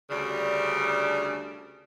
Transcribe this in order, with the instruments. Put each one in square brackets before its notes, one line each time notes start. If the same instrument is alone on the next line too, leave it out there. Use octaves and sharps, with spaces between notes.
[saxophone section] D2 C#3 G3 D4